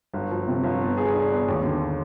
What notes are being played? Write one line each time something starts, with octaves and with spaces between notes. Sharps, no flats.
G1
F3
C3
G1
B3
G#4
D4
B3
D#2
D3